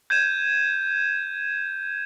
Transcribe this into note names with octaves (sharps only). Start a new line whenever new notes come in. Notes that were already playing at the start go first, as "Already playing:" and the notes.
G6 G#6 D#7 E7